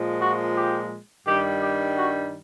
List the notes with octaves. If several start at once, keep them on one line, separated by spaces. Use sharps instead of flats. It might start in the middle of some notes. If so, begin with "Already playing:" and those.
Already playing: A#2 F3 G#3
F#4
G4
G2 D#3 G3 G4
G4
F#4